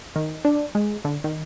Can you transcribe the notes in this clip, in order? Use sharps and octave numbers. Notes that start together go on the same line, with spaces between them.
D#3
D4
G#3
D3
D#3